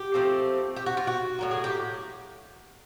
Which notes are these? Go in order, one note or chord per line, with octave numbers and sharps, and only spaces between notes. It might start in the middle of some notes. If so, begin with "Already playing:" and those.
Already playing: G4
F3 A3 C4
G4
F#4
F4
F#4
A2 F#3 A#3
G#4
G4